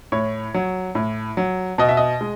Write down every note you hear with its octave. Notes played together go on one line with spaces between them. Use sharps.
A2 C#5
F#3
A2
F#3
B2 D#5
E5
D#5
G#3